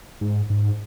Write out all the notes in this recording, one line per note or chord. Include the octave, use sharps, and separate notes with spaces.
G#2
G#2